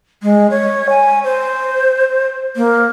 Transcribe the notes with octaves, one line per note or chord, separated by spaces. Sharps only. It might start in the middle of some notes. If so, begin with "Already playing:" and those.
G#3
C#5
G#5
C5
A#3